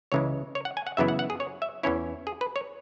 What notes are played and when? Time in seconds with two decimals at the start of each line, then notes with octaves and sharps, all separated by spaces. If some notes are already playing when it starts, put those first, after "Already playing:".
0.12 C#2 C#3 E3 G#3 C#5
0.55 C#5
0.65 F#5
0.77 G#5
0.87 F#5
0.97 F#2 C#3 E3 B3 E4 E5
1.08 F#5
1.19 F#5
1.30 G#4
1.40 C#5
1.62 E5
1.83 E2 E3 C#4 E4 C#5
2.27 G#4
2.41 B4
2.56 C#5